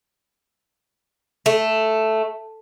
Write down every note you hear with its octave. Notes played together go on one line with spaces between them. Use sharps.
A3